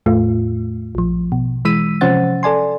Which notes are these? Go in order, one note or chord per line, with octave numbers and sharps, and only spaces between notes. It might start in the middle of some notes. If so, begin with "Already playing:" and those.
E2 A2 A3 F4
A#1 F3
B2
E3 G#3 E6 B6 D#7
C3 F3 C#4 C5 F#5 A6
A4 D5 G#5 C6